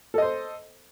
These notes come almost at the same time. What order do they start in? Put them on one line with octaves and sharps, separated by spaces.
A4 D#5 C5